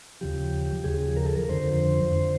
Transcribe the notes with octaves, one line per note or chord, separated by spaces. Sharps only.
D#2 C#3 F3 G4
D#2 C#3 F3 G#4
A#4
A4
A#4
F2 D3 F3 C5
F2 D3 F3